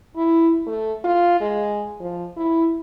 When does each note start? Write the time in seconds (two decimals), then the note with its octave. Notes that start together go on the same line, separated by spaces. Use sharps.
0.16 E4
0.67 A3
1.04 F4
1.41 G#3
2.00 F3
2.37 E4